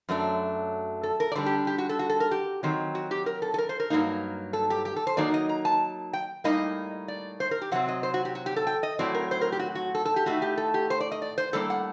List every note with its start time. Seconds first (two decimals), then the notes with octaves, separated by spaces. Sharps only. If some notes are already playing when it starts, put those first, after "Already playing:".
0.09 F#2 F#3 A3 D4
1.03 A4
1.20 A#4
1.32 D5
1.35 D3 G3 D4 C5
1.46 G4
1.67 G4
1.78 F#4
1.89 A4
1.99 F#4
2.09 A4
2.20 A#4
2.31 G4
2.63 D#3 F#3 C4
2.95 F#4
3.11 G4
3.26 A#4
3.42 A4
3.54 A4
3.58 A#4
3.69 C5
3.80 A#4
3.90 G2 F#3 A#3 D#4
4.53 A4
4.70 G4
4.85 G4
4.96 A4
5.07 C5
5.17 D#3 F#3 A#3 D#4 D5
5.34 D#5
5.49 A#5
5.65 A5
6.13 G5
6.44 A2 G3 A#3 D#4 D#5
7.08 D5
7.40 C5
7.51 A#4
7.61 G4
7.71 C3 F#3 C4 F#5
7.88 D#5
8.03 C5
8.14 F#4
8.25 G4
8.35 F#4
8.46 G4
8.56 A4
8.67 G5
8.83 D#5
8.99 A2 F#3 C4 D5
9.14 A#4
9.31 C5
9.41 A#4
9.52 G4
9.60 F#4
9.75 F#4
9.95 A4
10.05 A4
10.16 G4
10.26 A2 A3 D#4 F#4
10.42 G4
10.57 A4
10.74 G4
10.90 C5
11.00 D5
11.12 D#5
11.22 D5
11.38 C5
11.53 A2 G3 A#3 D4 A4
11.70 F#5